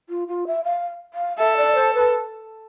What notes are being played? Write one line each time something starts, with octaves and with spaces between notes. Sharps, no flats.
F4
F4
E5
F5
F5
A4 E5
D5
C5
B4